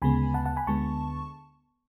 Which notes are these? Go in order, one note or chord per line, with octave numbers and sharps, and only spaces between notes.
D2 C#3 G#3 B3 G#5 B5
F#5 A5
F#5 A5
G#5 B5
D2 D3 G#3 B3 A5 C#6